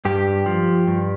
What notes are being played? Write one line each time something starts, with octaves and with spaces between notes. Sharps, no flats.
G2 G4
F3
G2